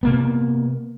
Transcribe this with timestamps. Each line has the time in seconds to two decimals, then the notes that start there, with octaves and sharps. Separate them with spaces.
0.03 C3 A#3 B3